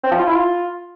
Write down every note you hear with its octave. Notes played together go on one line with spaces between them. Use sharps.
C4
F3
F4
E4
F4